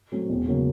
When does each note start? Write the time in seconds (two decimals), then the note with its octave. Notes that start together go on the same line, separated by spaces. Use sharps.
0.12 F#3 A3 C4
0.29 E1
0.47 C#3 F#3 A#3